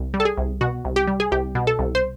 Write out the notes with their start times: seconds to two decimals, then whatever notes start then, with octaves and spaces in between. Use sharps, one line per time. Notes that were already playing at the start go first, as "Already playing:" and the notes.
Already playing: C2
0.14 G3
0.20 A4
0.25 G#4
0.37 C2
0.61 B2 F#4
0.85 C2
0.96 G4
1.07 G3
1.20 G#4
1.31 C2 G4
1.55 B2
1.67 A4
1.79 C2
1.95 C5